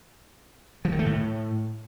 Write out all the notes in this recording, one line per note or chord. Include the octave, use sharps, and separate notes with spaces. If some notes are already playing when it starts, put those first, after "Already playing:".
F3
D#3
A3
A2